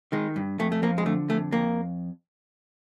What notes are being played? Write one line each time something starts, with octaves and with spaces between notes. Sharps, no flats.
D#3 G#3
G2
F2 A3
A3
F3 A#3
G#3
D3 A3
F2 A3
F2 A#3